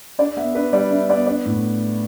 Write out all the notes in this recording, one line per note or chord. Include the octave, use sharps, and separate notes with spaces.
D4 D5
B3 E5
D4 B4
G3 D5
D4 E5
B3 D5
D4 D5
A2